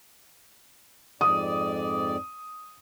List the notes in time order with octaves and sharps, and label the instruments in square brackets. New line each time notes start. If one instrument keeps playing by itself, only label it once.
[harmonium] F2 G#2 D5 [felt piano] D#6